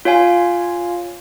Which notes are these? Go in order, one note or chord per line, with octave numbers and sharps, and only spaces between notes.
F4 C#5 F5 G#5